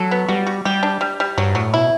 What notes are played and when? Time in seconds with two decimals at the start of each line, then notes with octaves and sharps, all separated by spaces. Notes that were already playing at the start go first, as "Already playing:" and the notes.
Already playing: F#3 A4
0.11 B3
0.28 G3 F#4
0.47 F#4
0.65 G3 G4
0.83 D4
1.01 G3
1.20 G3
1.38 G2 F#3
1.55 A2 F#3
1.74 B2 E4